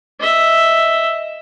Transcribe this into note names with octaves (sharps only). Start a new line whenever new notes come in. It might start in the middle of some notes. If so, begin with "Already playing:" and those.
D#5 E5